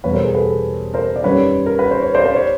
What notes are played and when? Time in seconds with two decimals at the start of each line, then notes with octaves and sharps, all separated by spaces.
0.04 E2 B2 G3 B4 C#5
0.13 A#4 C5
0.24 G#4 A#4
0.34 A4 B4
0.94 A#4 C5
1.16 D5
1.24 F#2 D#3 G3 B4 C#5
1.66 A#4
1.79 B4
1.91 C5
2.02 C#5
2.14 C5 D5
2.26 C5
2.36 C#5